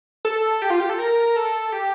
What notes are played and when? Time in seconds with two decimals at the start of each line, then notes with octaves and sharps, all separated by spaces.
0.25 A4
0.62 G4
0.70 F4
0.80 G4
0.90 A4
0.99 A#4
1.36 A4
1.72 G4